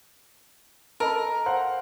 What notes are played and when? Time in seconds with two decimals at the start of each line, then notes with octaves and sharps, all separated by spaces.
1.00 A4 A#4 D#5 B5
1.46 C5 F5 F#5